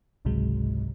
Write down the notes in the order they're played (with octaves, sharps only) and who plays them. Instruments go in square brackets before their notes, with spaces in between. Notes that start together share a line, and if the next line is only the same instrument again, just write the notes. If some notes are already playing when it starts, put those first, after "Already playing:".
[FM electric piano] G#1 C#2 G#2 C3 F#3 G#3